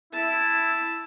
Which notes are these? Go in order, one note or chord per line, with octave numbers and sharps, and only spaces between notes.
E4 A5